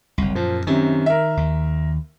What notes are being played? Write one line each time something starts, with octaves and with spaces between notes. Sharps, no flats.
F#1 C2
F#2 A#2 F3
F#2 C3 D#3
A#4 E5
D#2